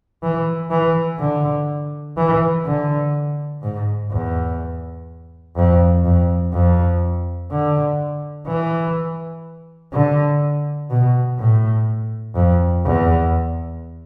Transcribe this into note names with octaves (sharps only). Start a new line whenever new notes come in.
E3
E3
D3
E3
D3
G#2
E2
F2
F2
F2
D3
E3
D3
B2
A2
F2
E2